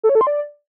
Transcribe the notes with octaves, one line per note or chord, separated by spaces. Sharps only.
A4
C#5
A4
C6
D5